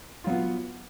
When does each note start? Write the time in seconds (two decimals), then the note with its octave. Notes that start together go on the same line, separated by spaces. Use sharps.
0.24 F4
0.27 F#3
0.30 B3